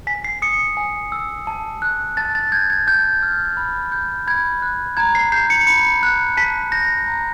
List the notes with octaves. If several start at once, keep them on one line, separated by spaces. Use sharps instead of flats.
G#5 B6
C7
D#6 C#7
G#5
E6
A5
F#6
A5 A6
A6
G6 G#6
G#6
A5 G6
F6
B5
G6
B5 G#6
F#6
A#5 G#6
C7
G6 C7
C#7
B5 C#7
F#6
A5 B6
G6 A#6
A#5